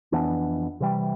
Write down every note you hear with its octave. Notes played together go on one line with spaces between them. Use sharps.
F2 E3 B3 D4
C3 E3 G3